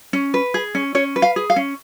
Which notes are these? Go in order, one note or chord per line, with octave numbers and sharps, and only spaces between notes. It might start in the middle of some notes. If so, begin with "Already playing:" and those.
C#4
B4
G#4
C#4
C#4 C#5
B4
F5
G#4
F5
C#4